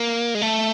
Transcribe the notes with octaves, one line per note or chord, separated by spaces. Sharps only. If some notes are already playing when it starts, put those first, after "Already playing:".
Already playing: A#3
G#3
A3